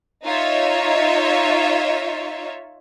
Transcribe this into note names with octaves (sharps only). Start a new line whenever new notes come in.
D#4 F4 C#5 E5